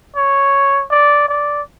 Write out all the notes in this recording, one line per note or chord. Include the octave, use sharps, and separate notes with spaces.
C#5
D5
D5